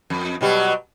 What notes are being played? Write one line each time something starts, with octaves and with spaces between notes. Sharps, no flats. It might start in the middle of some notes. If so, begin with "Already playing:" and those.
F2
B2 F#3 G3